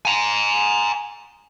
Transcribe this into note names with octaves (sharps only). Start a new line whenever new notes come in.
G#5 A#5